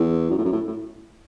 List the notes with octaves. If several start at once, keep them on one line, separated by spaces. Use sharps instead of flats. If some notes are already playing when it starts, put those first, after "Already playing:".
Already playing: E2
F#2
A2
F#2
A2
A2